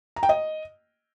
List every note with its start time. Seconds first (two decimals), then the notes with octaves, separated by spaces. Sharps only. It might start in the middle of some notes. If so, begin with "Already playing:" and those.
0.16 A#5
0.23 G5
0.29 D#5